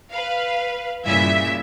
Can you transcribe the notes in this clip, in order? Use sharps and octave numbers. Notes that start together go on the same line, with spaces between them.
B4 F5
G2 A#2 C#3 E4 E5 G#5